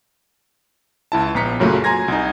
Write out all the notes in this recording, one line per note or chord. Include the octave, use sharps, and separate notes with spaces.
C#2 E4 A5
A#1 B3 A#5 B6 C#7
F#2 C#3 F#3 A3 A#3 F4
G#5 A#5 C6 G#6 A#6
C2 D#4